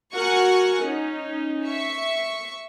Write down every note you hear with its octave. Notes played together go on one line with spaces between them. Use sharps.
F#4 A#4 F#5 G#5 C#6
C#4 D#4
E5 C#6